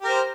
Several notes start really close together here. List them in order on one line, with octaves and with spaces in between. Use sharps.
G4 A#4 C5